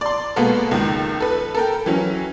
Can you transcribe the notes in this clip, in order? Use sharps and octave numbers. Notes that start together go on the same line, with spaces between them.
D5 C6
B2 G#3 A#3 B3 A4 A#4
C#2 D#3
A4 B4
A4 A#4 G5
E3 F#3 C#4